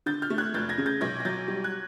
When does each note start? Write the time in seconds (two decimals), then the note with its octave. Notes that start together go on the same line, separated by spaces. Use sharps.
0.06 D3 G6 A6
0.22 F6 G6
0.30 A3
0.38 F#6 G#6
0.54 F1 G6 A6
0.69 G#6 A#6
0.78 C#3
0.86 G6 A6
1.01 B1 G#6 A#6
1.20 A#6
1.25 F#3 G6 A6
1.48 G3
1.64 F#6 G#6